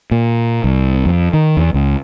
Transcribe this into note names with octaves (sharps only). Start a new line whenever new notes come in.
A#2
C2
F2
D#3
E2
C#2